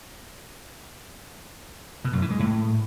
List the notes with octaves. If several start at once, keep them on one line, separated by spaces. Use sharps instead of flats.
B2
F#2
E3
G#3
A2